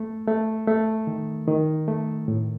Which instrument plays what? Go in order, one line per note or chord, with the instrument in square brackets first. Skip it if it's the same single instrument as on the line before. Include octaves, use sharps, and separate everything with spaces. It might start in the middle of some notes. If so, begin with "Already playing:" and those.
Already playing: [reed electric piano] A3
A3
A3
D#3
D#3
A3
A2